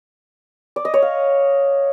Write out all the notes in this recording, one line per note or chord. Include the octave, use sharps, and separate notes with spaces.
D5
D#5
C#5
F5